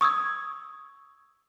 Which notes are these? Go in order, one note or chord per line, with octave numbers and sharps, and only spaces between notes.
C#6 D#6 E6 G#6